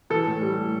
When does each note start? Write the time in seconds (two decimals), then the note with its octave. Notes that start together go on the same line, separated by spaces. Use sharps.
0.10 E3 A4
0.26 A2
0.42 G3
0.58 A2